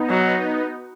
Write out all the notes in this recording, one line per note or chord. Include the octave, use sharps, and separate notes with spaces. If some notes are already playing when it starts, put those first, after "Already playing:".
Already playing: B3 D#4
F#3